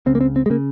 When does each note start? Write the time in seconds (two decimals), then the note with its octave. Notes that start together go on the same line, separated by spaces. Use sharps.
0.06 C#2 C#3 C4
0.15 A#3
0.21 C4
0.36 C4
0.46 G#3
0.50 C#3 A#3